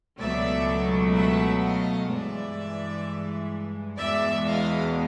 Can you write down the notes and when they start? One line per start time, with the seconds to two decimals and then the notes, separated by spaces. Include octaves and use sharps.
0.18 C#2 B2 F#3 A3 D5 E5
1.14 E5 F#5
1.61 D#5 F5
2.09 G2 E3 G#3 D5 E5
3.99 E2 B2 G#3 D5 E5
4.46 D#5 F5